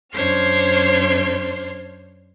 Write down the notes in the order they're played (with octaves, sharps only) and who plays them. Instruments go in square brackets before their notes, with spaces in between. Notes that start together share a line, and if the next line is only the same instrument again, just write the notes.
[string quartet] F#2 D4 C5 C#5 C6 F6